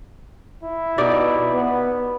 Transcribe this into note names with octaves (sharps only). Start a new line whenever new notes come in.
E4
B2 D#4 G4 D5
B3